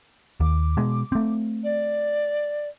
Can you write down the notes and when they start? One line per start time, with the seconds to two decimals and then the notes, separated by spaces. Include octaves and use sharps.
0.40 D#2 D6
0.77 B2 G#3
1.12 A3 C4
1.63 D5